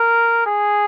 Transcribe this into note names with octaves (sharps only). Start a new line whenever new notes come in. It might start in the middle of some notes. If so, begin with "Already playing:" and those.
Already playing: A#4
G#4